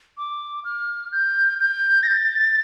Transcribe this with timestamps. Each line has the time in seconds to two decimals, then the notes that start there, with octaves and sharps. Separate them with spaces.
0.17 D6
0.65 F6
1.12 G6
1.60 G6
2.03 A#6
2.07 A6